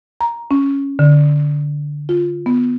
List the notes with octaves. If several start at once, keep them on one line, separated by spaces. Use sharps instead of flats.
A#5
C#4
D3
F4
B3